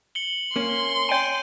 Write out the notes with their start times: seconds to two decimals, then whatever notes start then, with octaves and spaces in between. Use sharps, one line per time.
0.15 C#7 F#7 G7
0.56 A#3 C#4 C6
1.09 C#5 G5 G#5 G6 D7 D#7